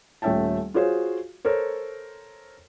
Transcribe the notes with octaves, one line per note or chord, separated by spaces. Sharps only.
D#1 A3 C#4 E5 G5 A5
F4 F#4 G#4 C5 C#5 F5
A4 A#4 C5 C#5